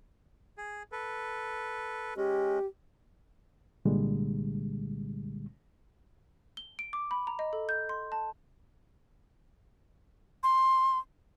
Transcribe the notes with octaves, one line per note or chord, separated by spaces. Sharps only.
G#4
A4 B4
G#3 C#4 G4
C2 A#2 D3 G3 G#3
G7
D7
D6
B5
A#5
D#5
A4
G6
C6
A5
C6